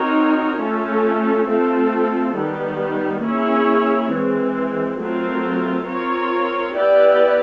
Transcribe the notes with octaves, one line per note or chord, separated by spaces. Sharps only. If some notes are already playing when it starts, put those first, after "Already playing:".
Already playing: C4 D#4 F#4 A#4 C#5
A3 C#4 F4 A4
A3 C4 F4 A4
D#3 G3 B3
A#3 C#4 E4 G#4 C#5
E3 G#3 C4
F#3 A3 C4 F4 A#4
C4 F4 A#4 C#5
B3 E4 G4 B4 D5